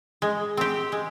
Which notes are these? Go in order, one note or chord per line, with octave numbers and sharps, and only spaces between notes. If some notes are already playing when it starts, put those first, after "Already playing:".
G#3
C4 G4
G#3